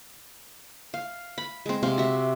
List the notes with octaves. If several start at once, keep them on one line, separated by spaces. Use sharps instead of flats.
F5
B5
G#3 C4
C3 C4 F5
F#4 E5